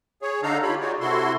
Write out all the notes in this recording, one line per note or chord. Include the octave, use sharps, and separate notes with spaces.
G#4 C#5
D3 D4 D#4 A4 F5 A#5
F4 G4 C#5 B5
D#4 F4 F#4 G#4 C#5 D5
C3 E4 F#4 A4 C6